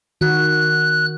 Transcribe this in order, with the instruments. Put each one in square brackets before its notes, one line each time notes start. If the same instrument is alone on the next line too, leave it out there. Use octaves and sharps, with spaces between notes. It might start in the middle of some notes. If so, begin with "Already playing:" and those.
[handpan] D#3 F#4 [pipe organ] F#6